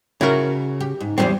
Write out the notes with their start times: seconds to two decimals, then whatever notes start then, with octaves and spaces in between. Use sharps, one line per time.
0.21 C#3 E4 F#4 A#4
0.81 G4
1.00 G#2
1.18 E2 G#2 G3 C4 G4 C5